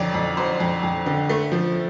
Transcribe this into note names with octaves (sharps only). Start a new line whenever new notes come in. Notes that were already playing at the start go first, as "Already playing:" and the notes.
Already playing: F2 D3 F#3 D5
F2
F#3 C5
F2
F2
D3
A3
F3